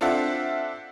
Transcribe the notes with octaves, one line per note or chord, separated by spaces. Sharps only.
C4 D4 F4 A4 E5 F#5